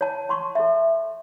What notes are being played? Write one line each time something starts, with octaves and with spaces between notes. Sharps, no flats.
C#5 A5
A5 C6 C#6
A4 E5